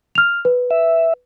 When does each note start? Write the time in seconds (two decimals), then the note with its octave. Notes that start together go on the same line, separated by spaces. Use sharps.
0.15 F6 F7
0.45 B4
0.71 E5